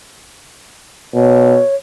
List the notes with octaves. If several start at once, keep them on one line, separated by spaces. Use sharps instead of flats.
B2 C#5